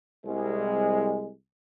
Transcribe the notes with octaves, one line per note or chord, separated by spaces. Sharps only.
C2 G#3